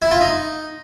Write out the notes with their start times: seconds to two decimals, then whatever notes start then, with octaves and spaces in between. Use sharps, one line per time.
0.02 E4
0.11 F4
0.21 D#4